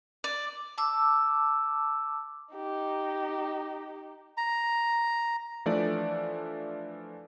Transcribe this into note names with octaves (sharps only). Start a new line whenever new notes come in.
D5
A5 D6 E6
D#4 G4
A#5
E3 F3 A3 D4 D5